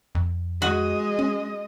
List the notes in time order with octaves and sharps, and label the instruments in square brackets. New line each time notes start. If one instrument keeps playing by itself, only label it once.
[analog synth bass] F2
[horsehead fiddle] G#3 D#5 [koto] F#4
[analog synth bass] C#4